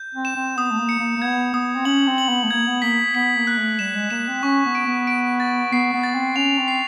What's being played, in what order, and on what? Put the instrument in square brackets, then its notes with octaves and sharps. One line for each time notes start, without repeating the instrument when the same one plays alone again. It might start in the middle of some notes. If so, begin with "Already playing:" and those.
Already playing: [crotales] G6
[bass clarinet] C4
[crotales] E7
[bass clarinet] C4
[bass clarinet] B3 [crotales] D#6
[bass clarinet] A3
A#3
[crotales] C#7
[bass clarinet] A#3
A#3
[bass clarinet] B3 [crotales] G#6
[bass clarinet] B3 [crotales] D#6
[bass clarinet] C4
[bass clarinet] C#4 [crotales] F#7
[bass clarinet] C4
[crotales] F#7
[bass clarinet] B3
A3
[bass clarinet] A#3 [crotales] G#6
[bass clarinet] B3
[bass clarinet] A#3 [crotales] B6
[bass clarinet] B3 [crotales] B6
[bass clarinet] A#3
[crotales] F#6
[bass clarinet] A3
[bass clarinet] G3 [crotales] E7
[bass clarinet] G#3
[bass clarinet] A#3 [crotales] E7
[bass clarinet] C4
[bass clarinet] C#4 [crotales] C#6
[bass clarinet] B3
[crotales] D7
[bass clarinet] B3
[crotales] D7
A6
[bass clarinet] B3 [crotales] C7
[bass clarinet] B3
[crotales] A6
[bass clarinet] C4
[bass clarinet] C#4 [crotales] F7
[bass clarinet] C4
[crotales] C7